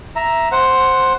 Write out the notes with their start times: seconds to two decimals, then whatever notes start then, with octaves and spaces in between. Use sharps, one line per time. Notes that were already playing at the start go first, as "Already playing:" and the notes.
0.16 E5 A#5
0.52 C5 F#5